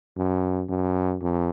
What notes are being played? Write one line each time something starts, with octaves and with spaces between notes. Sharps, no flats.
F#2
F#2
F2